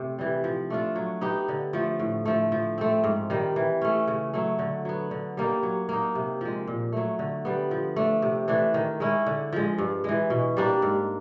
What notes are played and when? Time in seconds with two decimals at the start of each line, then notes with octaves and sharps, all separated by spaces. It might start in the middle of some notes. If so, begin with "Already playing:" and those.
Already playing: C3 A3 C4
0.19 E3 G3
0.44 F3
0.70 A3 D4 F4
0.96 F#3
1.21 B3 D#4 G4
1.48 D3
1.73 F3 A3
1.99 A2
2.25 F3 A3
2.52 F3
2.78 A3 C4
3.04 G#2
3.30 D#3 G3
3.56 E3
3.82 A3 C#4
4.08 C#3
4.34 F#3 A3
4.59 D3
4.85 F#3 B3
5.11 D3
5.37 G3 A#3 D#4
5.63 F#3
5.89 A#3 D#4
6.15 C3
6.41 F3 G#3
6.67 A#2
6.93 F#3 A3
7.19 D3
7.45 G3 B3
7.71 F3
7.96 A3 D4
8.22 C3
8.48 E3 A3 D4
8.74 D#3
9.00 G#3 C#4 E4
9.26 D3
9.53 F3 G#3
9.78 G2
10.04 E3 G#3
10.30 B2
10.57 G3 A#3 D4
10.82 G#2